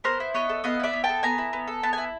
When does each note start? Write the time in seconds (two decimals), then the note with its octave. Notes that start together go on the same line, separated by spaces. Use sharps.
0.04 B3 A#4 C5
0.20 E4
0.34 B3 C#5 D#5
0.49 A4
0.64 B3 D#5 F5
0.80 E4 D5 E5
0.93 B3
1.04 G5 A5
1.09 A4
1.23 B3 G#5 A#5
1.38 E4
1.53 B3
1.67 A4
1.83 B3 A5
1.93 E4 G#5